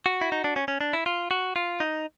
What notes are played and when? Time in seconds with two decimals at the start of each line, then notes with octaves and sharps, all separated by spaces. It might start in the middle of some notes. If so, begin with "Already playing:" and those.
0.06 F#4
0.21 E4
0.32 D#4
0.44 D4
0.56 C#4
0.68 C#4
0.81 D4
0.93 E4
1.06 F4
1.31 F#4
1.56 F4
1.80 D#4